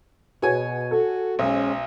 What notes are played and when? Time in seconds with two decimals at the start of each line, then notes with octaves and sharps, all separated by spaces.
0.42 B2 F#4 G#4 B4 C#5 G#5
0.91 F#4 A4
1.39 B1 G#3 C#4 C5